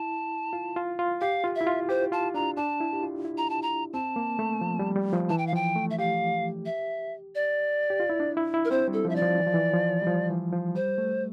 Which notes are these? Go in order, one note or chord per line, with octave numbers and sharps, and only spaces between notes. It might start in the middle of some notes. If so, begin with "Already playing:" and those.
Already playing: E4 A5
F4
F4
F4
G4 F5
F4
E5
E4
F4
G4 C5
F4 A5
D4 A#5
D4 A5
E4
G4
F4
E4
A#5
A5
A#5
C4 A5
A#3
A3
F3
G3
G3
F3
E3 A5
G5
F5
F3 G5
A3
E5
G4 F5
E5
D5
G4
F4
E4
D4
E4
E4
A#4
C4 C5
G3
A4
F3 E5
D5
F3
E3
F3
E3
F3
G3
F3
E3
F3
G3 C5
A3